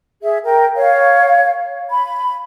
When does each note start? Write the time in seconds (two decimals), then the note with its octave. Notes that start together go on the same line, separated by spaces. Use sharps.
0.22 G#4 E5
0.44 A#4 G5
0.75 C#5 F5
1.89 B5